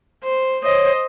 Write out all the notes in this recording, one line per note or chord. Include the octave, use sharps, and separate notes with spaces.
C5
C5 C#5 D#5